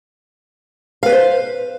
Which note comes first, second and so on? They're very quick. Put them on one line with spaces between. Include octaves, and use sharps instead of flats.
F5 B4 D5 C5